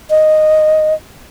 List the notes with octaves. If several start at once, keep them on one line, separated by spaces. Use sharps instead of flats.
D#5